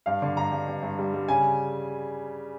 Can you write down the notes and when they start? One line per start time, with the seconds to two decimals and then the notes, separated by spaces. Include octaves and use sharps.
0.06 G2 F5
0.22 D3
0.37 G2 A#5
0.52 G2
0.68 G2
0.83 G2
0.99 G3
1.14 G3
1.28 C#3 G#5